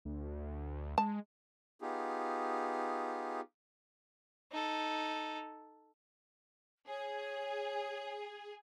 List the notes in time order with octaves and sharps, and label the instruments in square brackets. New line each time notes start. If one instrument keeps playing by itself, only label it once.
[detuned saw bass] D2
[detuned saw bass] G#3 [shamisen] A5
[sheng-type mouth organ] B3 D#4 F4 G4 G#4
[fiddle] D#4 A4
[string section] G#4 [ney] C#5